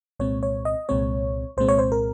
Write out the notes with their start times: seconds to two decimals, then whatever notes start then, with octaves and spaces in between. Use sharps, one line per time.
0.19 C2 A#2 G#3 C4 C#5
0.43 C#5
0.65 D#5
0.89 C2 A#2 G#3 C4 C#5
1.57 C2 A#2 G#3 C4 C5
1.68 C#5
1.79 C5
1.92 A#4